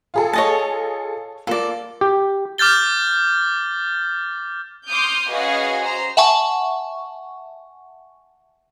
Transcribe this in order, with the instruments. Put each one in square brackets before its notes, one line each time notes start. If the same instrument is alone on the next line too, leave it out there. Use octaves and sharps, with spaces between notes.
[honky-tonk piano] F4 G#4 A4
[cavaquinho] C#5 D#5 A5
[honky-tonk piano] A#3 F4 [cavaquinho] A4 D5
[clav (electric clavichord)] G4
[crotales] D6 F6 G6 A6 G7
[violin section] C6 D6 D#6 F6 G6
C#4 F#4 G#4 B4 D#5 F5
C5 A#5
[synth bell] E5 F#5 G#5 A5 C#6